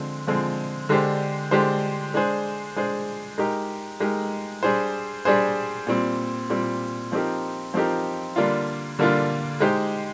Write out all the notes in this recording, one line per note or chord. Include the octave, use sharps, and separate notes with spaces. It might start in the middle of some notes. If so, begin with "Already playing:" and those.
Already playing: D3 F3 G#3 C4
D3 F3 G#3 C4
D3 G#3 D4 G4 C5
D3 G#3 D4 G4 C5
G#3 D4 G#4 C5
G#3 D4 G#4 C5
G#3 D#4 G4 A#4
G#3 D#4 G4 A#4
G3 D4 G#4 C5
G3 D4 G#4 C5
A#2 G3 C4
A#2 G3 C4
F3 C4 D#4 G4 A#4
F3 C4 D#4 G4 A#4
D3 G3 A#3 D4 F4
D3 G3 A#3 D4 F4
G#3 D#4 G4 C5